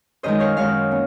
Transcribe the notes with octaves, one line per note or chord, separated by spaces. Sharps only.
F#2 D#3 G#3 C5 D#5
C#5 F5
F#2 D#3 G#3 C#5 F5
A#3 C#4